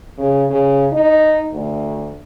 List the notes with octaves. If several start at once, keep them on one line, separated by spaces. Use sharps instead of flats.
C#3
C#3
D#4
D2